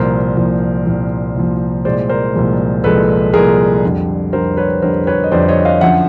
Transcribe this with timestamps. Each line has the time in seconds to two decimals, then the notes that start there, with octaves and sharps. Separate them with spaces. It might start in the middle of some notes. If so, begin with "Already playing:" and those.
Already playing: C2 A#2 F3 A#4 C5
0.37 C2 A#2 F3
0.86 C2 A#2 F3
1.35 C2 A#2 F3
1.85 C2 A#2 F3 G#3 C5 D5
2.09 A#4 C5
2.34 C2 A#2 F3 G#3
2.84 C2 A#2 F3 G#3 A4 B4
3.33 C2 A#2 F3 G#3 G#4 A#4
3.83 F2 D3 G3
4.33 F2 D3 G3 A#4 C5
4.57 B4 C#5
4.82 F2 D3 G3 A#4 C5
5.07 B4 C#5
5.24 D#5
5.32 F2 D3 G3 C5 D5
5.48 C#5 D#5
5.65 D#5 F5
5.81 F#2 D3 F3 E5 F#5